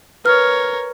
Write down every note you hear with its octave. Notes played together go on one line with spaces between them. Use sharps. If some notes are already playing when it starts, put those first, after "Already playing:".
A#4 B4 C#5 F6